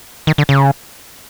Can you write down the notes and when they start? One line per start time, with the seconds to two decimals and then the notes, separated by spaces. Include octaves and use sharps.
0.27 D#3
0.38 D3
0.49 C#3